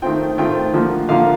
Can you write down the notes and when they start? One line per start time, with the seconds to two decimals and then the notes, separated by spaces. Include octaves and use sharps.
0.02 D#3 A3 C4 F4 G5
0.38 D#3 A3 C4 F4 G5
0.73 D3 F3 A#3
1.09 D3 F3 A#3 F5